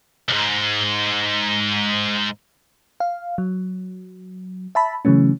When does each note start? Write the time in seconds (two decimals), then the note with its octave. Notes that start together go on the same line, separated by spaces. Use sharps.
0.29 C#2 G#2
3.00 F5
3.38 F#3
4.75 E5 A5 B5
5.05 C#3 E3 F#3 A3 C#4